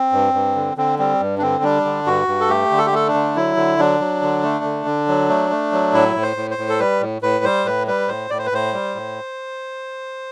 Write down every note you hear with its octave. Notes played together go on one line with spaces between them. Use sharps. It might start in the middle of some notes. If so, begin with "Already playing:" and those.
Already playing: C4
G2
G2
D3
D3 C4
G3 C4
G2
D4
D3 C4
G3 D4
D3
G2 F#4
G2
A4
A3 G4
D3
A4
G4
A3 A4
D4
D3
F#3 E4
D3
F#3 D4
F#3
D3
A3
D3
D3
F#3
A3
A3
F#3
A2 E4
A2
C5
A2
C5
A2
A4
G3 B4
A2
A2 B4
G3 C5
A2 B4
G3 B4
A2 C5
A2 D5
C5
B4
A2 C5
G3
A2